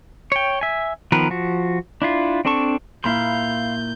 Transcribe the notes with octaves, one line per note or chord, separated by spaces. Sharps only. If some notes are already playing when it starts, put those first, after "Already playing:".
C#5 G5
E5 G#5
D#3 F3 B3 A#4 B4
F3 F#4
D4 E4 F4
C4 D4 A4 A5 C#6
A#2 E4 F5 B5 C6 G6